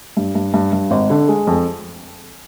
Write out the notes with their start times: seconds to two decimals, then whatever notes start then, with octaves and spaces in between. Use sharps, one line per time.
0.17 G2
0.35 G2
0.54 G2
0.73 G2
0.91 G#1
1.10 D3
1.28 G#3
1.47 F2